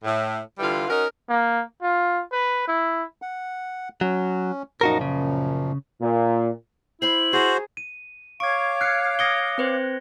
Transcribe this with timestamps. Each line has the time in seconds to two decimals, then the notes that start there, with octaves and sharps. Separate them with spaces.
0.04 A2
0.59 D3 E3 G3 F4
0.88 C#4 D#4 F#4 A#4
1.29 A#3
1.82 F4
2.32 B4
2.68 E4
3.22 F#5
4.01 F#3 C#4
4.81 F#2 A#2 F3 D#4 F#4 A#4
5.01 C#3
6.01 A#2
7.02 E4 C5 B5 C6 F#7
7.33 F#4 G#4 C5 A#5
7.77 D#7
8.40 C#5 F5 C#6 D6 G#6 D7
8.81 F6 F#6 G#6 C7 C#7
9.19 D#6 G#6 A#6 C#7 D7 G7
9.58 C4 B4 C5